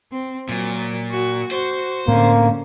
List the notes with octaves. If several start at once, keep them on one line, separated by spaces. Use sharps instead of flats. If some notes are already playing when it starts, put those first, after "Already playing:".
C4
A#2 F#3
F#4
F#4 C5
A2 D3 A3 A#3 C4 C#4